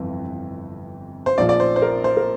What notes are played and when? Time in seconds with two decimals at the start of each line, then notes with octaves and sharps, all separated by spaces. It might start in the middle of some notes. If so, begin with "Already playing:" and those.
Already playing: G1 F2 C3 E3
1.26 C5
1.38 A#1 A#2 F3 D5
1.49 D5
1.60 C5
1.76 C5
1.82 A#4
2.04 C5
2.17 A#4